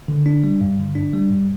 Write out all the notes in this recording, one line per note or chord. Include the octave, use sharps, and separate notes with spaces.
D3
D4
G3
G2
D3
D4
G3
G2